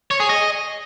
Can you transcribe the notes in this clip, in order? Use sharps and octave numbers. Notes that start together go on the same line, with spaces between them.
C#5
G#4
D#5